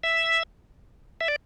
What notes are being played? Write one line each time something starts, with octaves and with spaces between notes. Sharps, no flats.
E5
E5
D5